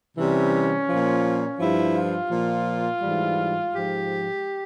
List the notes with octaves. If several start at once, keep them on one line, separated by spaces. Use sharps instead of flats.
C3 E3 G3 C#4
A#2 F3
G2 F3 E4
F4
A#2 F3
G#2 E3 G3
G#2 F3 G4